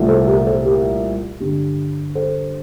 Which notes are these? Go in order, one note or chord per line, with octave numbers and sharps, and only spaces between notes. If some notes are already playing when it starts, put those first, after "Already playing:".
Already playing: C2 A#2 A3
A4 C5
G4 A#4
A4 C5
G4 A#4
G2 D3 G3
A4 C5